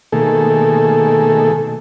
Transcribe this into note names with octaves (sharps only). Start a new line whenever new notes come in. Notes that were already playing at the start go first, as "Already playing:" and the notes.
B2 D#3 A3 A#3 G#4 A4